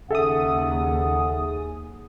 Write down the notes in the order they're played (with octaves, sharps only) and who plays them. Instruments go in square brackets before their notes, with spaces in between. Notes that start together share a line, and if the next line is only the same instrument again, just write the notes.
[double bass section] D#2 [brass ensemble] C#3 F#5 [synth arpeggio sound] G#4 D#6 [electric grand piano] A4 E5